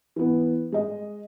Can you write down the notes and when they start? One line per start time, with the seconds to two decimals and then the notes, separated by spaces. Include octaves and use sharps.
0.16 E3 B3
0.72 G#3 D#5